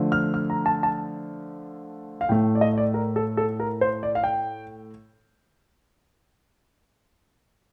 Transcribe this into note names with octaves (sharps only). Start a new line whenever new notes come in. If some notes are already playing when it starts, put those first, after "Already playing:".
Already playing: D3 F3 A3
F6
F6
A#5
A5
A5
F5
A2 A3 G5
D5
D#5
D5
A#4
A4
A4
A#4
C5
D5
F5
G5